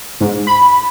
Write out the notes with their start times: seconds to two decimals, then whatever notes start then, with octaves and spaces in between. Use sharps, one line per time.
0.21 G#2
0.47 B5